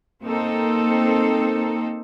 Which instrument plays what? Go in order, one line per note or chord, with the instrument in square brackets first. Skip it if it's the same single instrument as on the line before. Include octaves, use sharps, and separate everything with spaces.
[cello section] A#3 C4 D#4 A4